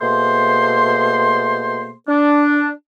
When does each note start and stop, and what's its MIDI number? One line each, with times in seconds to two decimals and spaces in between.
0.01 1.90 47
0.01 1.90 57
0.01 1.90 58
0.01 1.90 68
0.01 1.90 72
0.01 1.90 84
2.08 2.69 62